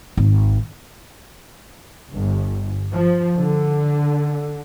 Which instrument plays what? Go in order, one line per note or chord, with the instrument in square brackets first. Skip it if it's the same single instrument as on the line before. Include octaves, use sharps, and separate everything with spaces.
[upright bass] G#1
[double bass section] G1
F3
D3